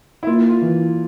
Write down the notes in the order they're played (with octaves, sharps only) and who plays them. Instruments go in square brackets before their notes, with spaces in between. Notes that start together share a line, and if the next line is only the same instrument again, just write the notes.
[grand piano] E4
[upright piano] A#3 [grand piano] F4
[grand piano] F4
[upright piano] E3